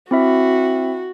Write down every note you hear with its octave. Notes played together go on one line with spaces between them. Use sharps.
C4 E4 F#4 E5